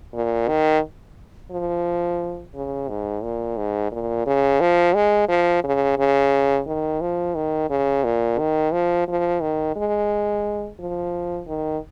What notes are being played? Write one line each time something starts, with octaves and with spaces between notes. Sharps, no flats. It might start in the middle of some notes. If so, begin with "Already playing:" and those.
A#2
D#3
F3
C#3
G#2
A#2
G#2
A#2
C#3
F3
G#3
F3
C#3
C#3
D#3
F3
D#3
C#3
A#2
D#3
F3
F3
D#3
G#3
F3
D#3